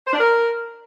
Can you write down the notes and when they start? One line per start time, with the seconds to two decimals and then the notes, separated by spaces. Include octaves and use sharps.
0.06 C5
0.13 D4
0.20 A#4